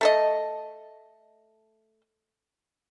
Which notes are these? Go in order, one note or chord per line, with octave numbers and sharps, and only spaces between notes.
A3 A4 D#5